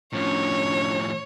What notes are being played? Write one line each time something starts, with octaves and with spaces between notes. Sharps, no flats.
A2 F3 C#4 D4 C#5